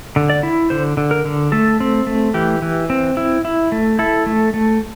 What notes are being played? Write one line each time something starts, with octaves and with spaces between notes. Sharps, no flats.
D3
D5
E4
D3 C5
D3
A#4
D3
A3 A4
C4
A3
E3 G4
E3
C4
E4
E4
A3
E4 A4
A3
A3